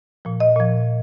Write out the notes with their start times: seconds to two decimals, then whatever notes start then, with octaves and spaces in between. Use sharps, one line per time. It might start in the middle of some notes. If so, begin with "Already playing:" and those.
0.25 A#2 F3
0.40 D#5
0.56 A#2 F3